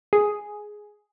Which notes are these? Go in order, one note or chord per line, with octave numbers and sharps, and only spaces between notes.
G#4